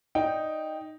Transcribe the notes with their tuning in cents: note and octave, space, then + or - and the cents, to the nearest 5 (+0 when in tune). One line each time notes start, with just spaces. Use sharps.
D#4 +0 D5 +0 G5 +0